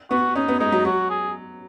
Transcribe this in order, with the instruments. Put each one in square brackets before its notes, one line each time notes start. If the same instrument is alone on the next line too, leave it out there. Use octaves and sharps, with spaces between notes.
[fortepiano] B3 [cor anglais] F#4
[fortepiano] C#4 [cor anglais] D#4
[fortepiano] B3
[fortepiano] G#3 [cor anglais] D#4
[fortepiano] F#3
[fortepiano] F#3 [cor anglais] F#4
[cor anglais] G#4